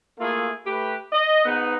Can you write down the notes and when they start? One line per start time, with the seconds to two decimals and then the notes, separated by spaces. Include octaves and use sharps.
0.19 A3 A#3 E4 F4 G#4 A4
0.65 A3 G4 B4
1.12 D#5
1.45 G#2 B3 D#4